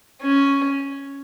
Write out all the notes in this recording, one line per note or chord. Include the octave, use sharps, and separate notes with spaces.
C#4